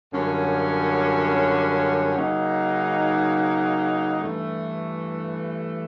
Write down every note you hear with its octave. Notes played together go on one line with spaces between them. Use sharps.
F#2 D3 G3 A#3 C#4
C#3 F#3 A#3 D#4
G2 E3 A3